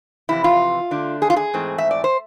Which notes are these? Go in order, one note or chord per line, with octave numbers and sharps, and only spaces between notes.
F2 C3 E3 E4
F4
D3 A3 D4
G#4
F4
G#4
G#2 E3 A3 C4
E5
D5
C5